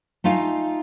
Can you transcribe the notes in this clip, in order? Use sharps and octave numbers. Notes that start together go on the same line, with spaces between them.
A3 D#4 F4 F5 G#5